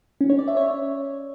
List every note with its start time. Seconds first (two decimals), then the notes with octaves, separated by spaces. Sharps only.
0.21 C#4
0.30 C#5
0.39 D5
0.48 E5
0.57 C#5